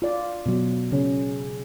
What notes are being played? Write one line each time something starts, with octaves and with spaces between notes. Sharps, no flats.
F4 D5
B2 F#3
C#3 C#4